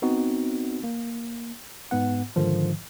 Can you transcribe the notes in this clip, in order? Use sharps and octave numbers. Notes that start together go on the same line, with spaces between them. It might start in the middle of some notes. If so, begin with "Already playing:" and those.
B3 C4 D#4 F#4
A#3
G#2 B3 F#5
G#2 D3 D#3 F3